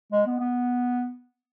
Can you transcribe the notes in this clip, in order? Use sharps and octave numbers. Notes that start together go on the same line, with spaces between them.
G#3
B3
B3